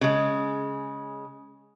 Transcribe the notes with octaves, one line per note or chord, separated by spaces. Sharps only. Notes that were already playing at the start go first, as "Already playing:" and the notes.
C#3 G#3